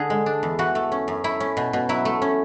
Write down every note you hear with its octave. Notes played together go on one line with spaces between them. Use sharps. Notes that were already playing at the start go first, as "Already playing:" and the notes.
Already playing: D3 G#4
G#3
D4
E2
E3 F#4
A3
C#4
F#2
A3 E4
C#4
B2
B2
F#3 E4
A3
C#4